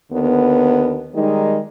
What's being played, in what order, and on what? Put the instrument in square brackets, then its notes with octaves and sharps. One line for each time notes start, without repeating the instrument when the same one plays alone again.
[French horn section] D#2 D3 B3
D#3 G3 G#3 D#4